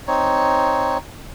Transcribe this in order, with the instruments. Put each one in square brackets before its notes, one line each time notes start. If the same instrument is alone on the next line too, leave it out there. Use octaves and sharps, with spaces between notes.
[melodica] C4 D#4 C#5